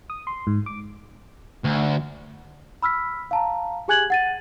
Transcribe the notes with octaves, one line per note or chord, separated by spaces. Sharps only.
D#6
C6
G#2
D6
D2
B5 E6 F6 B6
F5 A5 A#5
G4 G#4 G#5 F#6 G#6 F#7
F#5 A6 D#7